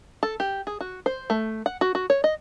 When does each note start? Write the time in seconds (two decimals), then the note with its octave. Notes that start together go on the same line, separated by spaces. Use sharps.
0.23 A4
0.40 G4
0.67 G#4
0.80 F#4
1.06 C5
1.30 A3
1.66 F#5
1.81 F#4
1.95 F#4
2.10 C#5
2.24 D#5